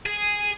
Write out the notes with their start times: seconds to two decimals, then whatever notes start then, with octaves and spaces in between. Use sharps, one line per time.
0.06 G#4